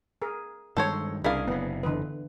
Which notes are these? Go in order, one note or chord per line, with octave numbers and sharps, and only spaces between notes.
G#4 A#4
G2 D#3 G#3 A4 C5 C#5
C2 C#3 D4 E4 G#4 A#4 F5
F#1 C3 B3
D3 E3 B4